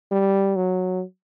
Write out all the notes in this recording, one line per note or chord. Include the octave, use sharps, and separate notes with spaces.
G3
F#3